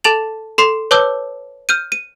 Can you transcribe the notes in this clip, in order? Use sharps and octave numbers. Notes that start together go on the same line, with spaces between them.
A4 A5 A6 F7 F#7
A4 C6 C7
B4 C#5 A5 D6 E6 G6
F6 G6 D#7
D#7